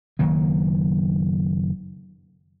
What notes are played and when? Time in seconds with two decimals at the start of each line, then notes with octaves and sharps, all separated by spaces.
0.19 F#1 D#3 F#3 A#3